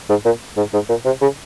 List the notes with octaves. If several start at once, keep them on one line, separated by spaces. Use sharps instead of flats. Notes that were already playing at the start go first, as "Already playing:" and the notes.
G#2
A#2
G#2
G#2
A#2
C3
C#3